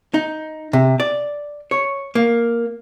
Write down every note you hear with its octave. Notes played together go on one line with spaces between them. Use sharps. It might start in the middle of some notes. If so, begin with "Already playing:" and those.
D#4
C3
D5
C#5
A#3